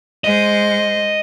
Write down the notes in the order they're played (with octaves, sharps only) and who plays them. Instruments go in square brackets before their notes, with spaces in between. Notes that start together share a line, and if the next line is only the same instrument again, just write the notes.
[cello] G#3 C5 [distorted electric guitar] D#5